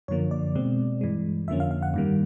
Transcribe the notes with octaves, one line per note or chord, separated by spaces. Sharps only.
F#2 D3 F3 A#3 C#5
D5
B2 G#3 C4
G2 E3 G#3
F2 D3 F3 A#3 C#4 E5
F5
F5
F#5
G2 D#3 G3 A#3